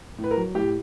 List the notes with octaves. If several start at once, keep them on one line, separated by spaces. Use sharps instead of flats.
A2
B4
A#4
F#3
A2 G4